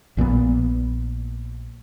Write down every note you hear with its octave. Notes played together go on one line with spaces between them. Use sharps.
A#1 A#2 D#3 B3